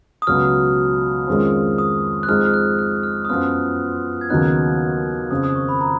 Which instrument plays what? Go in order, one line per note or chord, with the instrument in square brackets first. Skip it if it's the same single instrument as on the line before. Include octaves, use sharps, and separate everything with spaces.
[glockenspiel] D#6
[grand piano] C#2 B2 F#3 [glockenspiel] F6
[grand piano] F2 D#3 G#3 C#4 F4
[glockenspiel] D#6
F#6
[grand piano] F2 F3 G#3 D#4 [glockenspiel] F6
[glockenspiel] F6
F#6
F#6
F6
D#6
[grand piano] F#2 F3 B3 F4 [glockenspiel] F6
[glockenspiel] G#6
[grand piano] D#2 C#3 F#3 B3 D#4 [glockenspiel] F#6
[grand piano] F2 C#3 F3 [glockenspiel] D#6
[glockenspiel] D#6
C#6
B5
A#5